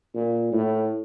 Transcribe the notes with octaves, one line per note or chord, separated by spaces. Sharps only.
A#2
A2